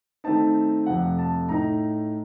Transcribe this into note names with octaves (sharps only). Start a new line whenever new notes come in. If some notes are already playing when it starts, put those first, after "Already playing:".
D#3 A3 C4 D#4 A5
F2 C3 F3 A3 F#5
A5
A2 A3 D#4 A#5